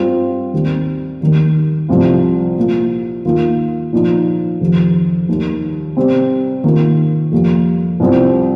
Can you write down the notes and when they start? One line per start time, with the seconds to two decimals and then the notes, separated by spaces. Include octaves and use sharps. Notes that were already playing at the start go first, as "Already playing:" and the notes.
Already playing: G2 G3 C4 F4
0.54 D#2 D#3 G3 C4
1.21 D#2 D#3 G3
1.89 C2 C3 F3 C4 F4
2.57 A#2 F3 A#3 F4
3.25 D#2 D#3 A#3 F4
3.93 A#2 F3 D#4
4.61 F2 C3 D#3
5.29 D#2 D#3 G3
5.97 C3 G3 C4
6.64 C3 D#3 A#3 F4
7.32 F2 C3 G3 A#3
8.00 C2 C3 F3 C4